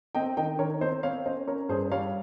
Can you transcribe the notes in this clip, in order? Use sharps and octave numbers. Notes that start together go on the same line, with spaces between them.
C4 D#5 G5
D#3 D#5 G5
D#3 A#4 C#5
C4 C5 D#5
C4 C#5 F5
C#4 C5 D#5
C#4 A#4 C#5
G2 G#4 C5
G3 C#5 F5